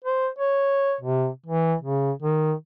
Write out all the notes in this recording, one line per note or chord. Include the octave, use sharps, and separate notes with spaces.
C5
C#5
C3
E3
C#3
D#3